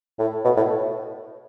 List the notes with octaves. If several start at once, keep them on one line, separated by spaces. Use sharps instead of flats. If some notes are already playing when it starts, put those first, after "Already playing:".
A2
B2
A2